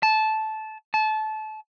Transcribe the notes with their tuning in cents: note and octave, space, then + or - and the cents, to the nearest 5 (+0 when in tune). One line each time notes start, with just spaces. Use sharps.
A5 -15
A5 -25